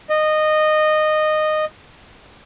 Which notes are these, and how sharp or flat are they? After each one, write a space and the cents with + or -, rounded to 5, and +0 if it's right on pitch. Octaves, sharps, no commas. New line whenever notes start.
D#5 -15